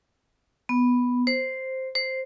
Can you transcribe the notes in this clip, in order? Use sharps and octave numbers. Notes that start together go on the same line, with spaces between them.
B3
C5
C5